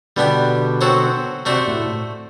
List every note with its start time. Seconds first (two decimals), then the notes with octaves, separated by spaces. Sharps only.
0.16 B2 D3 G3 B3 D4 G4
0.81 F#3 C4 F#4 A4 C5
1.46 C3 A3 D4 F#4 A4 C5
1.68 A2